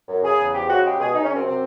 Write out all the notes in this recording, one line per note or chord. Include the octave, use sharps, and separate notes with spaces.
F#2
C#3 G#4
E2
F3 G4
C#3 F#4
G#3 G4
B2 G#4
C#3 D#4
C#4
F#2 C4
C3 C4